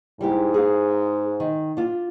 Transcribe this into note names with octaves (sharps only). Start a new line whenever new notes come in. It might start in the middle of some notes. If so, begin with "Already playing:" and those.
G#2 G3 E4 G4
G#4 F5
D#3
D4 F4